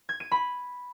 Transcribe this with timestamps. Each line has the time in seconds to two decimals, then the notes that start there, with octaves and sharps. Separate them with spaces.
0.09 G#6
0.20 D#7
0.32 B5